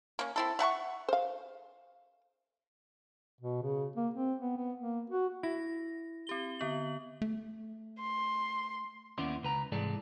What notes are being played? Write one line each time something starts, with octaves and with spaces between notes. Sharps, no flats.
A#3 C#4
C4 E4 A4
E5 F#5 A5 C#6
C5 F5
B2
C#3
A#3
C4
B3
B3
A#3
F#4
E4 A#6
C4 G4 G7
D3 B3 F#7
A3
C6
D#2 B3 C#4 E4 D5 C6
C#2 B4 A#5
C2 G#2 E3 G#3 A4 D5